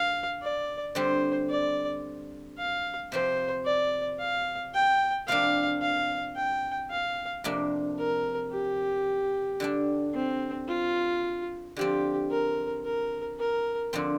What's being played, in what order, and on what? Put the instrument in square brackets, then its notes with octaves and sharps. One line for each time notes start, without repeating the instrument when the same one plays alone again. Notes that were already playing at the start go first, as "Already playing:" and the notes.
Already playing: [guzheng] D3 [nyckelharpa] F5
[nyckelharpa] D5
[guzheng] D3 G3 C4 [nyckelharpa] C5
[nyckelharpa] D5
F5
[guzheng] C3 F3 C4 [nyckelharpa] C5
[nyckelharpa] D5
F5
G5
[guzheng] C3 F3 A#3 D4 [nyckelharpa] F5
[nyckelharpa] F5
G5
F5
[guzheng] F2 C3 A#3 D4
[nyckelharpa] A#4
G4
[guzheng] D3 G3 D4
[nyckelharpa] C4
F4
[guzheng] D3 F3 C4 [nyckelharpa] G4
[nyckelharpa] A#4
A#4
A#4
[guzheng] D3 F3 C4